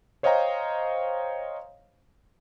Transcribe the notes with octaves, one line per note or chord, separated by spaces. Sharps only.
C5 C#5 D#5 F5 G5 A#5